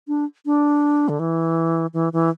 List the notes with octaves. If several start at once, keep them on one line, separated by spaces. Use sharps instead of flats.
D4
D4
D3
E3
E3
E3